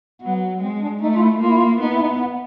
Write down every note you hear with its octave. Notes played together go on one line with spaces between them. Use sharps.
F#3 B3
G#3 C4
D4
A3 D#4
F4
E4
A#3 F4
E4
F4
B3 D#4
E4
D#4
B3